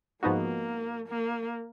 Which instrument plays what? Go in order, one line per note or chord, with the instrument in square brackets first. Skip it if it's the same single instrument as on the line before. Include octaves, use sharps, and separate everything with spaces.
[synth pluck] G#2 F3 B3 D#4 F#4 [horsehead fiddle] A#3
[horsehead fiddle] A#3